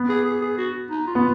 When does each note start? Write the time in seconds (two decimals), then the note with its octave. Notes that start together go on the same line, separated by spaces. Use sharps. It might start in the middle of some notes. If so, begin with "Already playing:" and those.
Already playing: B3
0.09 G#4
0.25 G#4
0.41 G#4
0.58 F#4
0.91 D#4
1.07 F4
1.15 B3